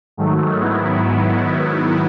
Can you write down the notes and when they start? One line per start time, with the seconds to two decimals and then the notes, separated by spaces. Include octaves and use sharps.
0.17 G#2 D#3 F#3 A3
0.58 G#2 D#3 F#3 B3 E4
0.97 G#2 D#3 F#3 B3 E4